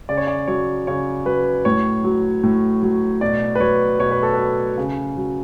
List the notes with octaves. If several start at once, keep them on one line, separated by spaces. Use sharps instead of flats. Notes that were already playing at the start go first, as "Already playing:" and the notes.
C#3 D5
C#5
D5
F#3 C#5
C#3 C#5
F#3 B4
A2 C#5
F#3
A2
F#3
B2 D5
B4
F#3 C#5
B2 C#5
B4
A4
B4
F#3
C#3
F#3